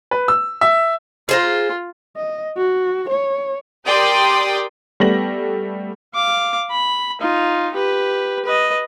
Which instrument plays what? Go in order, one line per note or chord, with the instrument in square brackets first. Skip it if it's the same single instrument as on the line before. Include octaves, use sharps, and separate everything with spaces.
[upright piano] B4
E6
E5
[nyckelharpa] F4 [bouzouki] G#4 C5 A#5
[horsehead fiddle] D#5
F#4
C#5
[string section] G4 A#4 D5 G5 C6 D#6
[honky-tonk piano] G3 A3 B3 A#6 F#7
[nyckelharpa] F5 D6
B5
D#4 F4
G4 B4
B4 D#5